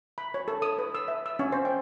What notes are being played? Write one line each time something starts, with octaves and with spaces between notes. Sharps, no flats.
B5
C#5
A4
D#6
B4
E6
E5
E6
C#4
C5
G5